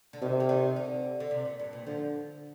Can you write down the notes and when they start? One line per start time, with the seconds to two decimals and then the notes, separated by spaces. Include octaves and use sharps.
0.13 D3
0.22 C3 D#3
0.40 D3
0.49 D#3
0.76 D3
1.20 D3
1.31 C3
1.45 A#2
1.59 G2
1.73 A#2
1.86 D3 F3